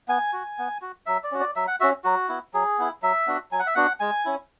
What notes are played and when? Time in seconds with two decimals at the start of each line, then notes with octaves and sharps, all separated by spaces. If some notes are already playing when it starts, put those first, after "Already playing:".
0.08 B3 G#5
0.33 F#4
0.58 B3
0.82 F#4
1.06 F#3 E5
1.24 D5
1.32 C#4 F#4
1.40 D5
1.56 F#3 E5
1.67 F#5
1.80 C#4 F#4 E5
2.04 F#3 F#4
2.29 B3 E4
2.54 F#3 G#4
2.79 B3 E4
3.02 F#3 E5
3.27 B3 D4 F#4
3.51 F#3 G#5
3.59 F#5
3.67 E5
3.75 B3 D4 F#4 F#5
4.00 G#3 G#5
4.25 C#4 E4